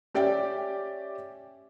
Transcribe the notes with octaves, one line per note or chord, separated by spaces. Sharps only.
C#4 G4 D5 E5 G5